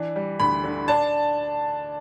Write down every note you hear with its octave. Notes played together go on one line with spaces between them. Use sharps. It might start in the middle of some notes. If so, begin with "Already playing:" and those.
Already playing: E3 D4
G3
D2 B5
D3
D4 A5